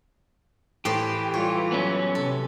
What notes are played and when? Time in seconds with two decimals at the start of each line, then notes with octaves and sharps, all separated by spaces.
0.85 A2 E3 G4 C5
1.34 G3 F4 C#5
1.72 F#3 B3 C#4
2.15 C3 A4